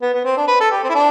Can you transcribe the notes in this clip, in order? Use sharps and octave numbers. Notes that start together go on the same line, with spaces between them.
B3
B3
C4
D4
B4
A4
G4
C4
E4
D4